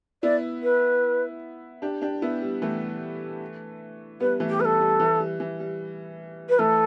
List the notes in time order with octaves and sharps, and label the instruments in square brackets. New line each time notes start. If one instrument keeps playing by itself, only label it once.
[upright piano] B3 E4 [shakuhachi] D5
[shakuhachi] B4
[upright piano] D4 G4
D4 G4
B3 E4
G3
E3 A3
[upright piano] G3 B3 [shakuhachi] B4
[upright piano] E3 A3
[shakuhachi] G4
[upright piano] G3 [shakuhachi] A4 B4
[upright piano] G3
E3
G3
E3
G3
[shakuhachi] B4
[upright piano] E3 A3 [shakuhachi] A4